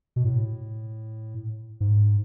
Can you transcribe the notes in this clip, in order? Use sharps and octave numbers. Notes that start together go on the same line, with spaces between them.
B2
A2
G#2